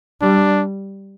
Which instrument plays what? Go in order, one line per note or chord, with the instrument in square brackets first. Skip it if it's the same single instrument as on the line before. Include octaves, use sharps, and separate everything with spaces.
[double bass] G3 [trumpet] D4